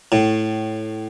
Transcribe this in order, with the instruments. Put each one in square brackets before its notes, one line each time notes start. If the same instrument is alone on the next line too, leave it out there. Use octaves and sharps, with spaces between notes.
[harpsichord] A2